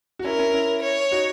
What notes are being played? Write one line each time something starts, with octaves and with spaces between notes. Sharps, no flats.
F#4
C#4 E4 A#4
C#4 E4
C#4 E4
C#5
D#4 F#4